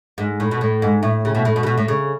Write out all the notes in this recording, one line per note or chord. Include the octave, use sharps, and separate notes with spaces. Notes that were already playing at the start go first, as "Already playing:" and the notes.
G#2
A2
B2
A2
G#2
A2
C#3
B2
A2
B2
C#3
B2
A2
C#3